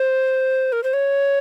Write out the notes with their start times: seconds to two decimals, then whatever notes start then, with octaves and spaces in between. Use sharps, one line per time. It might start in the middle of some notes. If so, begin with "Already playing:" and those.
Already playing: C5
0.72 A#4
0.84 C5
0.93 C#5